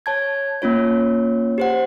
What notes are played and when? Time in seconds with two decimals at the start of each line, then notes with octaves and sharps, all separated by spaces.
0.06 C#5 A5 G#6
0.62 A#3 C#4 F4 C#5
1.58 G4 C5 F#5